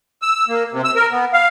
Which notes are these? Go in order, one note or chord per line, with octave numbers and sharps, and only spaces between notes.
E6
A#3
C3
E6
A#4
B3
F5